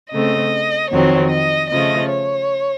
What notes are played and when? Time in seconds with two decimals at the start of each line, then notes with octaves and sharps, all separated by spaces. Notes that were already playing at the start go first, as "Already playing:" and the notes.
0.12 C#3 A3 C4 D#5
0.91 F2 D#3 F#3 C4 C#5
1.31 D#5
1.70 C#3 F3 A3 D#5
2.09 C#5